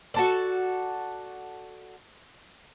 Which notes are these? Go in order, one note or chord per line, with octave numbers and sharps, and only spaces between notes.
F#4 A4 D5